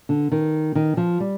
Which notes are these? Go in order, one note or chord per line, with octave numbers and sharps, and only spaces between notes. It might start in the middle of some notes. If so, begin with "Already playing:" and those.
D3
D#3
D#3
F3
G3